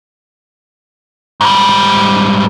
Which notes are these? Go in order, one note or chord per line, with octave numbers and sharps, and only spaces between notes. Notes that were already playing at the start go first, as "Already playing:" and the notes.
G#2 G3